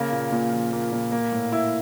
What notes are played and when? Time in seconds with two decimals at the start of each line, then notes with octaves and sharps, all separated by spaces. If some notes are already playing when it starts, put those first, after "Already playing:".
Already playing: C#3 A#3
0.12 A#2
0.32 A#2
0.52 F3
0.72 A#3
0.92 A#2
1.12 A#3
1.32 A2
1.52 E4